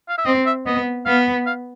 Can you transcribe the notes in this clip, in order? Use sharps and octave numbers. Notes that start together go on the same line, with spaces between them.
F5
E5
C4 D#5
E5
B3 D#5
B3 F5
F5